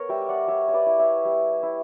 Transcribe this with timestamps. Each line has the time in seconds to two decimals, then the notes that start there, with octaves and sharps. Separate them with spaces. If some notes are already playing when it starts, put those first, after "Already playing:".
Already playing: B3 A#4 C#5
0.09 G3 E5 G5
0.29 D5 F#5
0.48 G3 C#5 E5
0.69 C#5
0.74 B4 D5
0.86 E4
0.99 C#5 E5
1.25 G3
1.63 E4